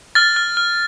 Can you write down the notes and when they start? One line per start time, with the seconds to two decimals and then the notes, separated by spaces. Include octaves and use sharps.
0.15 F6 A6
0.36 F6
0.57 F6